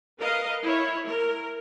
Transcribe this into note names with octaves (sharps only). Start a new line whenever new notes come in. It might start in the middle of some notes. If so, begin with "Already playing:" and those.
A#4 B4 D#5 F5
E4 C#5
A#4